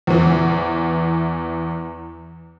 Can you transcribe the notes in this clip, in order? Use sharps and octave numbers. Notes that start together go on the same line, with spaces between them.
E2 E3